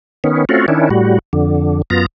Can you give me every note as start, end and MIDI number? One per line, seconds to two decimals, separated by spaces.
0.24 0.45 51
0.24 0.45 59
0.24 0.45 61
0.49 0.66 57
0.49 0.66 60
0.49 0.66 61
0.49 0.66 65
0.49 0.66 66
0.68 0.89 51
0.68 0.89 61
0.68 0.89 62
0.68 0.89 64
0.90 1.19 45
0.90 1.19 55
0.90 1.19 66
1.33 1.82 41
1.33 1.82 50
1.90 2.06 42
1.90 2.06 59
1.90 2.06 65
1.90 2.06 82